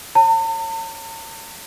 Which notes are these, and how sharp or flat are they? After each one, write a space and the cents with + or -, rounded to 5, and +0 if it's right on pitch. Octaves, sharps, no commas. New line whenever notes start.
C#5 -10 A5 +45